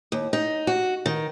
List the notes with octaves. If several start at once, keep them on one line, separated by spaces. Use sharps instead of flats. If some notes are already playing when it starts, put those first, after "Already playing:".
D#2
D#4
F#4
D#3